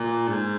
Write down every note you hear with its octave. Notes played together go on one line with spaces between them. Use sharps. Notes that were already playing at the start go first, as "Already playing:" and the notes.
Already playing: A#2
G#2